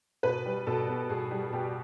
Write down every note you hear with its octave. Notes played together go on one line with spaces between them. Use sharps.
B2 B4
G3
B2 A4
B3
B2 G#4
G3
B2 G4